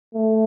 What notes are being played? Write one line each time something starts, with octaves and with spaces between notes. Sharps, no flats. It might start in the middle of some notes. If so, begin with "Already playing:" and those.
A3